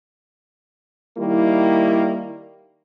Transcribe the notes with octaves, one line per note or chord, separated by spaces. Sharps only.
D#3 G3 A#3 E4